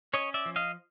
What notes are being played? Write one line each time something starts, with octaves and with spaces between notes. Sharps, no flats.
C#4 C#5 D#5
D5 E5
F3
D#5 F5